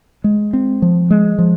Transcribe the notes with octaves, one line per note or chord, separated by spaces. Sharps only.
G#3
C4
F3
G#3
F3